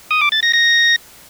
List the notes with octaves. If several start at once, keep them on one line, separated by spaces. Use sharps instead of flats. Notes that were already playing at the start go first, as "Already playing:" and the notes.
D#6
D6
A6
A#6
A#6